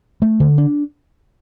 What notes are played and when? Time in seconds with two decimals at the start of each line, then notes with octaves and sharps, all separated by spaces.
0.22 A3
0.40 D3
0.58 D4